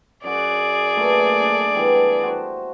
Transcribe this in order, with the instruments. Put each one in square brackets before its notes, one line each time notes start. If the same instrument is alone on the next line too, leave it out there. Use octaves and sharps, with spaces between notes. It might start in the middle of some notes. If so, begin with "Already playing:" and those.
[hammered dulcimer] F#2 F#4 [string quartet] G#4 D5
[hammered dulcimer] A#2 A3 B4
D4 A5
E3 G3 B3
F#4 C5